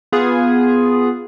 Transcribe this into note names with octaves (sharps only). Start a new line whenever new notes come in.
B3 F4 G#4